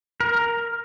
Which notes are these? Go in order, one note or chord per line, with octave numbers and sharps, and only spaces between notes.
A#4